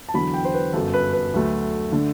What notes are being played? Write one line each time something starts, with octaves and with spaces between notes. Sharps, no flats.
A5
E2 D3 F#3 B5
G5
C5
B4
G1 F#2 F#3 A4
B4
B4
D2 D3 F#3 A3
D3 A3